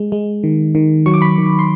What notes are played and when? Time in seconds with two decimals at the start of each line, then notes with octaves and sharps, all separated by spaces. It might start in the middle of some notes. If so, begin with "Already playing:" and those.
Already playing: G#3
0.12 G#3
0.44 D#3
0.75 D#3
1.06 F#3 C#6
1.14 D6
1.21 B5 C#6
1.38 D#3
1.59 C6